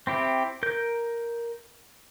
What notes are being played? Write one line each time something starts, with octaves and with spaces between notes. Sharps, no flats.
C4 E4 G4
A#4 G6